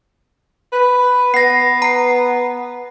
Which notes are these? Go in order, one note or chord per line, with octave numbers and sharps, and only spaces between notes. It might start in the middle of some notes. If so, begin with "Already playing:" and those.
B4
B3 A#6 C7
A#5 C7